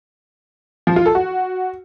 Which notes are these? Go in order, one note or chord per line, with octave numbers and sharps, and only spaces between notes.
F3
F4
A4
F#4